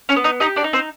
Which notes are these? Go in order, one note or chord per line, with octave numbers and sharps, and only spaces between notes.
C#4 C#5
B3
D#4 D#5
D#4 G4 D#5
D4 D5
D#4
C4 C5